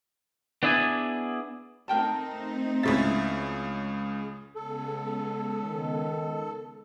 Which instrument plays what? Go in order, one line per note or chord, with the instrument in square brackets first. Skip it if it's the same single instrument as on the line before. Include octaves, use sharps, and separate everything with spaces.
[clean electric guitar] B3 D4 E4 G#4 D5 G#5
[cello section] A3 C4 D#4 [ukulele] A#4 G5 A5
[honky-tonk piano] C#2 C#3 A6 [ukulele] E4 E5
[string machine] C#3 G#3 B3 [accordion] A4
[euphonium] D#3